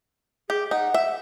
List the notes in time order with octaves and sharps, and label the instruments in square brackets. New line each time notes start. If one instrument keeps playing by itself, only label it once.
[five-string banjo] G4 [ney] G#4
[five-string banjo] D#4 [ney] F#5
[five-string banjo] E5